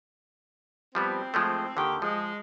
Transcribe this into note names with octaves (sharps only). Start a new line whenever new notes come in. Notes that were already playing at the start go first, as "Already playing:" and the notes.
F3 G3 B3 C4
F3 G#3 A3
D#2 D3 D#3 G4
F3 G#3